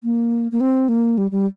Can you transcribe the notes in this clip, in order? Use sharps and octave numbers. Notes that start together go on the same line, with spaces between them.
A#3
A#3
C4
A#3
G3
G3